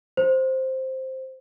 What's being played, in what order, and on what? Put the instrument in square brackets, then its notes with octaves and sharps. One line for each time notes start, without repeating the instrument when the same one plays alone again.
[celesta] C5